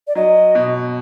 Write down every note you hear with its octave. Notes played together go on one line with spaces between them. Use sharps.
D5
F#3 D#5
B2